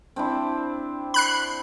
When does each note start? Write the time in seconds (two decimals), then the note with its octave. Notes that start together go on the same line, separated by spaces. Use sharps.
0.16 C4 D4 E4
1.14 B5 F#6 C7